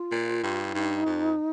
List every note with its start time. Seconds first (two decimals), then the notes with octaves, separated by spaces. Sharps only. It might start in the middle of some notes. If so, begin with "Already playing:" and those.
Already playing: F4
0.12 A#2
0.43 G2
0.74 G2 D#4
1.06 F2